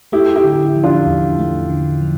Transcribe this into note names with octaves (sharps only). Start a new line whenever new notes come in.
A3 E4 G4
E4 G4
D3
F3
D4 F4
E2
A3
D3
F3